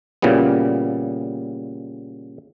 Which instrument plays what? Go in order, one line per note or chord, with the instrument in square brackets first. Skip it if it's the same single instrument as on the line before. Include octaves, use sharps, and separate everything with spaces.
[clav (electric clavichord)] A#2 C#3 E3 G3 B3